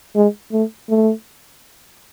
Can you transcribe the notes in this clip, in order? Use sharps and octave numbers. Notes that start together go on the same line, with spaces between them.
G#3
A3
A3